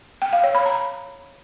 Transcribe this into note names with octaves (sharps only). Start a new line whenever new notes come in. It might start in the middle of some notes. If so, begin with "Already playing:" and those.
G5
F5
C#5
B5
A#5